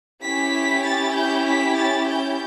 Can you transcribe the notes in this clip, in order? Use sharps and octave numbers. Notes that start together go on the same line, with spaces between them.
C#4 E4 G4 B6
A6
G6
B6
A6
G6